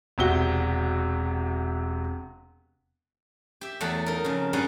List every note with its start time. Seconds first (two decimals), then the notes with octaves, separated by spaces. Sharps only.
0.18 E1 C3 F#4 G7
3.61 G4 E5
3.81 E2 F#3 A3 A4 F#5
4.06 D#4 A#4
4.25 F2 C#3
4.53 G2 C#3 G3 G#4 D#5 F#5